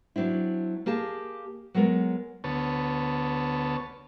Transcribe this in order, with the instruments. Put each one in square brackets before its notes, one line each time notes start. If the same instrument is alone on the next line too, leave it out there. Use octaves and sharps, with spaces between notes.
[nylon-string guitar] F#3 C4 D4 E4
A#3 G4 G#4 A5
F#3 G#3 B3 A#4
[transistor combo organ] D2 B3 C#5 A5